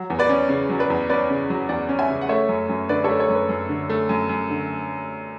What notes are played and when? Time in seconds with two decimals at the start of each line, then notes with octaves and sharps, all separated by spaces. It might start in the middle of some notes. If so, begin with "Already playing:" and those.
Already playing: F#3
0.10 E2
0.19 B4 D5
0.29 C#4
0.49 C#3
0.70 F#3
0.79 B4 D5
0.90 E2
1.09 C#4 B4 D5
1.30 C#3
1.50 F#3
1.69 E2 D5 F#5
1.89 C#4
1.99 E5 G#5
2.09 C#3
2.21 F#5
2.29 A3 C#5 E5
2.49 F#2
2.69 F#2
2.89 D3 B4 D5
3.04 A4 C#5
3.10 A3
3.19 A4 C#5
3.29 F#2
3.35 B4
3.49 F#2
3.69 D3
3.90 A3
4.09 F#2
4.29 F#2
4.50 D3